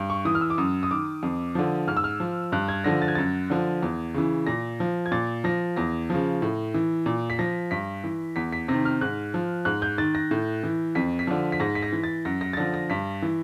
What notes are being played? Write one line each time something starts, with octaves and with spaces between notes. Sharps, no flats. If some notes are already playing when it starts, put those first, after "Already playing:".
Already playing: G2
C#6
E3 D#6
F6
E6
D6
F#2 D#6
D#6
D#3 D6
F2
D3 F3
G#2 F6
E6
F6
F3
G2 F#6
G#6
D3 F3 A#6
A6
G#6
F#2 A6
D3 F3
E2
C#3 E3
A#2 A#6
F3
G#6
A#2 A6
F3 A#6
E2 A#6
C#3 F3
A2
E3
A#2
B6
F3 A#6
G2 B6
E3
E2 B6
B6
C3 D#3 A#6
F6
G#2 F#6
F3
G#2 F#6
G6
D#3 A6
A#6
A2
E3
F2 B6
B6
D3 F3
B6
G#2 A#6
B6
A#6
E3
A6
F#2 A#6
A#6
A6
D3 F3 A#6
A#6
G2 B6
E3